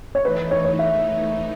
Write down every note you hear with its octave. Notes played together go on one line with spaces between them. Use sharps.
C#5
E3 A3 D#4 B4
C#5
C#5
E5